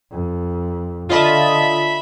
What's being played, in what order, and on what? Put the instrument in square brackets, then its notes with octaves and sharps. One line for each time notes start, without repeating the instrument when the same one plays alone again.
[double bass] F2
[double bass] D3 [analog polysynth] F4 D#5 A5 [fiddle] E5 B5